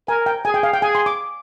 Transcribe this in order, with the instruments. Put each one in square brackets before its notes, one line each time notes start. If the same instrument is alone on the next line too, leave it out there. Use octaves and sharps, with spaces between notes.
[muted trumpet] A#4 [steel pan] G#5
[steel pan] G5
[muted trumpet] G#4 [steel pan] G#5
[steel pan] G5
F5
G5
[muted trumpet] G#4 [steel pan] G#5
[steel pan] C6
D6